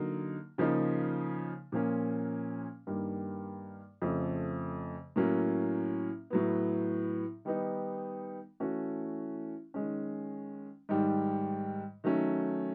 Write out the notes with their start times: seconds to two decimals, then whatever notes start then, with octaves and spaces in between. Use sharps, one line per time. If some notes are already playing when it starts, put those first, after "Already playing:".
Already playing: D3 F#3 A#3 D#4
0.58 C#3 F3 A#3 D#4
1.72 A#2 F3 A#3 C#4
2.87 G2 D#3 G3 A#3
4.02 F2 C#3 F3 A3
5.16 A2 F#3 A#3 C#4
6.30 A2 F#3 B3
7.45 D#3 G3 B3 D#4
8.60 E3 A3 C#4 F#4
9.74 D#3 G#3 C#4
10.89 G#2 D#3 G3
12.04 D#3 F#3 A3 C#4